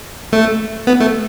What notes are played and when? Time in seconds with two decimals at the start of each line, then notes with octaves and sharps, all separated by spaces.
0.33 A3
0.87 B3
1.00 A3